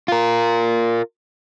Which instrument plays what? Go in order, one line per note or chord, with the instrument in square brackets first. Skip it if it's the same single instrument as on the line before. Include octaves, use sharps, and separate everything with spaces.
[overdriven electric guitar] F4 A#4